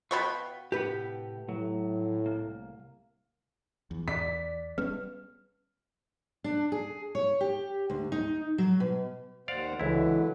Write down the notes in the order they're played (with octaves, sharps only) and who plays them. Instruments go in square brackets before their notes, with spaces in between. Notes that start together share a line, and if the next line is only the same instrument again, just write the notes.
[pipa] B2 B5 C#6 [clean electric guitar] B4 F5 G5
[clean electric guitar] A2 C3 F#5 [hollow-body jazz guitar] G4 B4
[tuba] A2 [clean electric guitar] F#3
[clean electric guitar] C2 A#3
[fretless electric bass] E2
[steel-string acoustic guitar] D5 [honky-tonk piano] B6
[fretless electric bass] G3 B3 C#4 [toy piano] B4
[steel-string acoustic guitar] D4
G#4
C#5
G4
D2
D#4
F#3
B2
[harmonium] D#2 C5 F#5 [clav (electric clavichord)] D5 F5
[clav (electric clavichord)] C#2 E4 [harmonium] D3 F#3 B4 [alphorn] E3